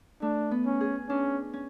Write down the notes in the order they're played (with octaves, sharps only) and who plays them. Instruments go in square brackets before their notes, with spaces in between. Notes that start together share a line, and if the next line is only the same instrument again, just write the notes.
[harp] A3 [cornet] D4
[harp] B3
[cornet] C#4
[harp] G#4
[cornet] C#4 [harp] D4
[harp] C#4